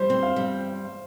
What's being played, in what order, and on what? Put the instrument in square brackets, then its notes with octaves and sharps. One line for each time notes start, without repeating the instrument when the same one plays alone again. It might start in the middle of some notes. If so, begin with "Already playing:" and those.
Already playing: [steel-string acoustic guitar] G3 [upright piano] C5
[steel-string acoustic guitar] C4
[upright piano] F5
[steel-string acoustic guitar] G3